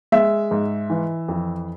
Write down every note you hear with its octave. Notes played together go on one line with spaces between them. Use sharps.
G#3 E5
G#2
E3
F2